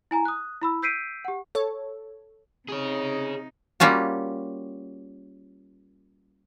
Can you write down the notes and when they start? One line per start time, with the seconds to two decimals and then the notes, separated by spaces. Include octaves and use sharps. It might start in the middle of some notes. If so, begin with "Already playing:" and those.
0.11 E4 G#5 A#5
0.25 D#6 F#6
0.62 E4 B5 E6
0.82 E6 G6 B6 C7 D7 D#7
1.25 G4 F#5
1.55 A4 C#5
2.69 C3 D#4 G#4 C#5
3.80 G3 A#3 C#4 F4 F#4